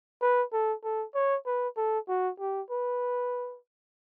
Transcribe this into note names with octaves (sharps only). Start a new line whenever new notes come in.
B4
A4
A4
C#5
B4
A4
F#4
G4
B4